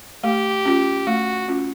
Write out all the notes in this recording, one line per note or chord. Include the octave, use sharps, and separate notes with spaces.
A3 G4
C#4 F4
A3 F#4
C#4 F4